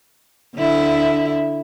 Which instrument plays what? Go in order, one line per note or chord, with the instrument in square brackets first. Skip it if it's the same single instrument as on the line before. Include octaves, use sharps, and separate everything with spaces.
[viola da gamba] D3 E4